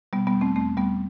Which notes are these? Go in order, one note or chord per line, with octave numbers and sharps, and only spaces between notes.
B2 G3 B3
G3 B3
E2
A3 C4
E2 A3 C4
E2 G3 B3